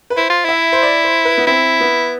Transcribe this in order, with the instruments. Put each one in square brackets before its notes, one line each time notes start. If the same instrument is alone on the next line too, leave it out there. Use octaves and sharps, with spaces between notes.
[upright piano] B4
[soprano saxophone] E4 [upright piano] C5
[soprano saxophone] F4
[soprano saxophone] E4 [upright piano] E5
[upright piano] C5
D5
C5
B4
B3
[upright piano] C4 [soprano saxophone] E4
[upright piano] B3